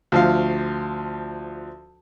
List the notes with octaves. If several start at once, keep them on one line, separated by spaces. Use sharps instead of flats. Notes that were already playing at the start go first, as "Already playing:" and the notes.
D2 F3 F5